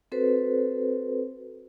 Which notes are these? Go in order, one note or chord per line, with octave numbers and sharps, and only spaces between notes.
C4 F#4 A4 B4 C5